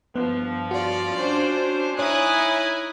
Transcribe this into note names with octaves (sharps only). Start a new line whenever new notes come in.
G2 F3 B3
F4 F#4 D5
C#4 D4 C5
D#4 E4 C#5 G#5 D#6 F#6